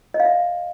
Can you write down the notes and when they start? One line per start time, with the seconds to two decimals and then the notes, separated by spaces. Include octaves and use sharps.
0.14 D#5
0.20 F5
0.25 E5